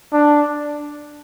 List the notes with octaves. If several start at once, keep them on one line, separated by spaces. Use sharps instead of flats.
D4